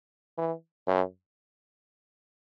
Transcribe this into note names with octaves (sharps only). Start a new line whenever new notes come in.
E3
F#2